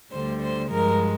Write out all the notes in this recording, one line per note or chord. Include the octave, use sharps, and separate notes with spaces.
D2 D3 G3 C5
C5
G2 F3 G#3 A#4